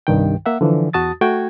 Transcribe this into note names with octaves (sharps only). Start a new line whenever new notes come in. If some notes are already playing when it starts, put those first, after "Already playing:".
C2 G2 D#3 G5
A#3 E5 F#5
D3 E3 F3
E2 F#4 A5 D#6 A6
A3 F#4 G5 G#6